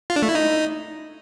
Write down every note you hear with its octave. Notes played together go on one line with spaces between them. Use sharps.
F4
D4
A3
E4
D#4